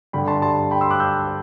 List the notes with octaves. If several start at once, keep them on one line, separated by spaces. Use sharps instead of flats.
G2 D3 G3 G5 B5
A5 C6
A5 C6
G5 B5
C6 E6
D6 F#6
E6 G6